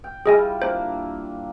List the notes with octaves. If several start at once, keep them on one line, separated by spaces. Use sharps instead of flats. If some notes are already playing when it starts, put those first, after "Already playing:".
G5
G3 E4 F4 G#4 D#5 G#5
A#3 D4 C5